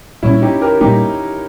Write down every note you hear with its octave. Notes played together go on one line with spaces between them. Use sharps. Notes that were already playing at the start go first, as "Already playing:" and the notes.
A#2 G3 A#3 C#4 E4
D#4 G4
G4 A#4
A#2 G3 A#3 D#4 G4